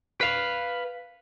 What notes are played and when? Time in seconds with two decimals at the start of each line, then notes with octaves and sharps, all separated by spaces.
0.21 B4 F5